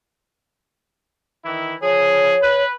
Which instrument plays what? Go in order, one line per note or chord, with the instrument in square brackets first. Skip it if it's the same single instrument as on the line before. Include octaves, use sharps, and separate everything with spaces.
[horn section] D#3 E3 E4
[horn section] F3 G#4 [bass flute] C#5
[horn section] B4